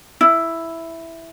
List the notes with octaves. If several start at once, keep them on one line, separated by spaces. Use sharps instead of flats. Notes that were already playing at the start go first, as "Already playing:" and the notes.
E4